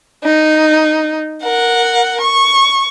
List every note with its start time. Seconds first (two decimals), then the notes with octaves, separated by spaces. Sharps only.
0.24 D#4
1.44 A#4 F#5
2.21 C#6